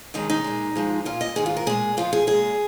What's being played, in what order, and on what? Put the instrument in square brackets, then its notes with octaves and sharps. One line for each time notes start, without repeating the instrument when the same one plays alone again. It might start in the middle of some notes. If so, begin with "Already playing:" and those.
[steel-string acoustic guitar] D#2 D#3 G#3 D#4
D#4
A#2 G#3
G#2 F3 G#3
A#2 G#3 F4
D#5
G#2 D#3 G#3 G#4
F4
A#4
A#2 G#3 G#4
F2 F3 G#3 F4
G#4
A#2 G#3 G#4